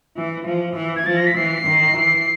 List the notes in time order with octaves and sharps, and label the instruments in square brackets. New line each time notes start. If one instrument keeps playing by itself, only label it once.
[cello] E3
F3
E3
[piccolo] G#6
[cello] F3 [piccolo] A6
[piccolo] A#6
B6
[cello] E3 [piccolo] C7
[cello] D#3
E3